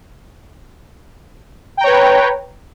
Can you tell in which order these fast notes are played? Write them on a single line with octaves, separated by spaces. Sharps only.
G5 A#5 C#5 B4